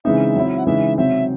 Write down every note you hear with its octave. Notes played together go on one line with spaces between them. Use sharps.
C#3 E3 G#3 C4 D#4 E5
F#3 C4 E4
F#5
C#3 E3 G#3 D#4 E5
C3 F#3 C4 E5